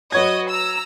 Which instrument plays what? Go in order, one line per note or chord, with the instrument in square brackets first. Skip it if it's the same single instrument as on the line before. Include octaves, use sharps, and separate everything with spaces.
[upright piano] F#3 C#5 G#6 [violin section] F#4 B4 D#5
[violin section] A#5 E6